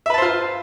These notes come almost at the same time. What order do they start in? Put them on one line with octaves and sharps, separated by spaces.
E5 B4 A5 C5 F4